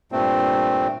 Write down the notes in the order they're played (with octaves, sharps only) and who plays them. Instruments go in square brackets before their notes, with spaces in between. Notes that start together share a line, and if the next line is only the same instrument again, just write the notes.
[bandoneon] G2 A#2 A3 C4